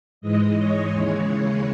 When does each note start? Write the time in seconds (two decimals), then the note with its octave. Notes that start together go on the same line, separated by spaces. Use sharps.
0.21 G#2 E3 G#3 D#5
0.57 C#5
0.91 D#2 C#3 E3 G#3 C#5